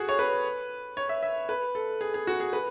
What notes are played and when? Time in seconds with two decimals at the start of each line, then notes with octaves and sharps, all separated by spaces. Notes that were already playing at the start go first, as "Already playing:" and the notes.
Already playing: F#4 G#4 A4
0.09 C#5
0.19 B4
0.97 C#5
1.09 E5
1.23 E5
1.49 B4
1.75 A4
2.01 G#4
2.14 G#4
2.27 F#4
2.40 G#4
2.53 B4